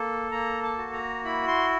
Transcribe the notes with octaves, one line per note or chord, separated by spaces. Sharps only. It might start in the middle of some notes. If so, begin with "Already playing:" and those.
Already playing: A#3 A4
A#3 A#5
A5
F#4
A#5
E4 B5
C6